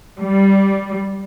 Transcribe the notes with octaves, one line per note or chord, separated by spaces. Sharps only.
G3